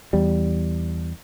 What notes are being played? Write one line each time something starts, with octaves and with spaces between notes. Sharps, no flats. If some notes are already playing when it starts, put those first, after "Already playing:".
E2 G3